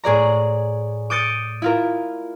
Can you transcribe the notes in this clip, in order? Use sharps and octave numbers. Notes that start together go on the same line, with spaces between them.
A2 G#4 D5 A#5
D6 D#6 G6 A6 C#7 D#7
E4 F4 A#4